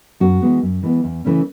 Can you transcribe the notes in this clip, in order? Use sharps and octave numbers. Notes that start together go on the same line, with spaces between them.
F#2 F#4
E3 G#3 B3
F#2
E3 G#3 B3
E2
C#3 E3 A3 C#4